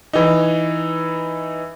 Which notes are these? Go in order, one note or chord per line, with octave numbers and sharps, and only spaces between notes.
E3 D#4